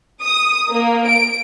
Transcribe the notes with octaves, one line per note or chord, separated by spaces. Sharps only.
D#6
A#3
D7